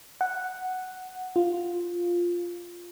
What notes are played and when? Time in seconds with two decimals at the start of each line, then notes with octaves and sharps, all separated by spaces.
0.21 F#5
1.36 F4